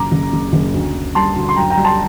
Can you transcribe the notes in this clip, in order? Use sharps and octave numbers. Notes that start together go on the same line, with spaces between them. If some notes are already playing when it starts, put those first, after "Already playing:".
Already playing: F#1 A#5 D6
F#1
F#1
F#1
D2
D2
G3 A5 C6
D2
C6
F#2 G5 A#5
G5 A#5
G3
A5 C6